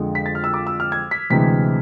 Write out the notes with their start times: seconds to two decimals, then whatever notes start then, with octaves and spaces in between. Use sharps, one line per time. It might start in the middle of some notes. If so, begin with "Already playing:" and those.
Already playing: F2 D3 G#3
0.15 B6
0.26 A6
0.35 F6
0.44 E6
0.54 D6
0.67 E6
0.80 F6
0.92 G#6
1.11 B6
1.30 D2 C3 E3 G#3 B6